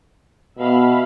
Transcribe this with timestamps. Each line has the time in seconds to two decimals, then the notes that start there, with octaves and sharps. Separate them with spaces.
0.58 B2 E5 F5 B5